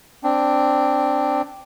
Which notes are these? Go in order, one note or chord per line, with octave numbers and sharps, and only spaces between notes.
C4 D4